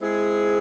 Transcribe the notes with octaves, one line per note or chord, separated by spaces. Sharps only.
G#3 C4 E4 G#4